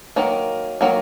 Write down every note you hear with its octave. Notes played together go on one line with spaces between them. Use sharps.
D#3 F#3 A#3
D#3 F#3 A#3